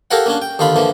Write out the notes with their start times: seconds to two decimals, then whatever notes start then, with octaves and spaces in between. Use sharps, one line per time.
0.11 G4 A4 A#4 C#5 F5 F#5
0.26 A#3 C#4 D4
0.42 G5
0.59 D#2 D3 F4 F5 B5
0.76 D3 E3 F3 A#3